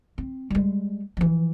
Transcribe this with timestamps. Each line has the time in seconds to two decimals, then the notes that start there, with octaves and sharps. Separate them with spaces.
0.18 C4
0.50 G3 G#3
1.17 E3 F3